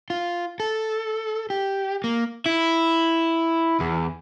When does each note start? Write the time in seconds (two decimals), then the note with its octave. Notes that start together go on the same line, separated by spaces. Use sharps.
0.10 F4
0.60 A4
1.50 G4
2.04 A#3
2.46 E4
3.80 E2